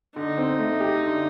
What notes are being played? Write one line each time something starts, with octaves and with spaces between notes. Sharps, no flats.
D3 D#4
C4
A3
G4
D3